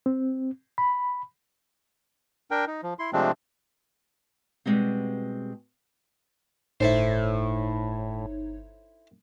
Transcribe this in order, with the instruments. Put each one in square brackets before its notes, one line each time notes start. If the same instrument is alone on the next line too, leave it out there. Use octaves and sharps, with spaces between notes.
[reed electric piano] C4
B5
[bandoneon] D4 A#4 G5
D#4
F3
E4 C6
C3 F3 G#3 A3 C4 D4
[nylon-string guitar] B2 G3 G#3 B3 C4
[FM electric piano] G1 D#4 C#5 [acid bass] A2 [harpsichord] E4 A4 C5